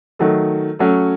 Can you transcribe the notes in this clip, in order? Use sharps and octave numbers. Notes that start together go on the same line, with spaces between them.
D#3 F#3 A3
F#3 A3 C#4